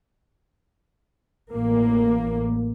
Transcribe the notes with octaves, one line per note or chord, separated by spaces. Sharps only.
A1 A#3